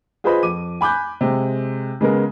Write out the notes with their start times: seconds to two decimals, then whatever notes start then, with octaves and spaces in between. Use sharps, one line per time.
0.24 F4 G#4 B4 C5 D#5 B5
0.43 F2 D6 D#7
0.81 G#5 B5 D6 F#6 G6
1.21 C3 G#3
2.01 C#3 G#3 B3 A#4